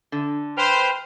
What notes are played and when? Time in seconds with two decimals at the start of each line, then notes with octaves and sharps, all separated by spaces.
0.12 D3
0.57 B4 C5 G5 F6